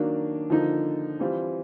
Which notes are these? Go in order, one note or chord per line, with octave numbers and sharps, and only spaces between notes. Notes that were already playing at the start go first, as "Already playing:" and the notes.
Already playing: D#3 F#3 A#3 D4
D3 F3 A#3 D#4
E3 G3 C4 F4